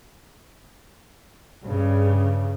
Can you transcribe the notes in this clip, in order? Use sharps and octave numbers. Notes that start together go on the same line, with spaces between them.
G2 C#3